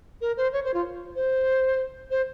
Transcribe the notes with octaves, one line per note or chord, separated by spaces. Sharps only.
A#4
C5
C#5
C5
F4
C5
C5